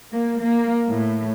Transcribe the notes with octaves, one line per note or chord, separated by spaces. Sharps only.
A#3
A#3
A2